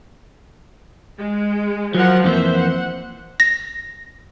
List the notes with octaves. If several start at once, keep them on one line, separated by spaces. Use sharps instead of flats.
G#3
F3 F#3 A#4 F#5
F2 E3 A#3 C5 E5
F#5
A#6